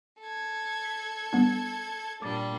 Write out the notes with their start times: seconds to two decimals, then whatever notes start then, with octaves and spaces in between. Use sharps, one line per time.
0.19 A4 G#6
0.85 B6
1.33 G3 B3 D4
2.22 A#2 G3 D4 D6 A6